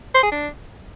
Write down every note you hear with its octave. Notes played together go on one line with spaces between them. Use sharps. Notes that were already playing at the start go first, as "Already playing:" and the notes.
C5
G#4
D4